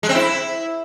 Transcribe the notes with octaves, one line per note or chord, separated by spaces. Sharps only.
G#3
C4
E4